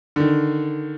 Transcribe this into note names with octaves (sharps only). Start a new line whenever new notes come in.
D3 D#3